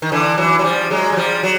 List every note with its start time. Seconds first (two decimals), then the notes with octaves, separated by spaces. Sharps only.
0.02 D#3
0.12 D3 E3
0.38 E3 F#3
0.59 F#3
0.64 F3 G3
0.90 F#3 G#3
1.12 F#3
1.17 F3 G3
1.43 F#3